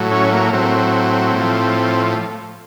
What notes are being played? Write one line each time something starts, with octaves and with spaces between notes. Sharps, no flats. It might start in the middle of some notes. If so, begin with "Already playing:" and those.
Already playing: A2 F#3
C#4
A#3
A2 F#3 C4
A2 F3